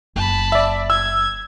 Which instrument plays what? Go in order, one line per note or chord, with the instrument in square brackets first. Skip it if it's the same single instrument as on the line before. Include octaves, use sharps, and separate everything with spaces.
[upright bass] F#1 [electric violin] A5 B5
[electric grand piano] D5 E5
[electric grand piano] E6 [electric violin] G#6